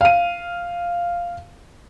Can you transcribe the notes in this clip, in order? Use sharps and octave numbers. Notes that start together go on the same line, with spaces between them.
F5 D#7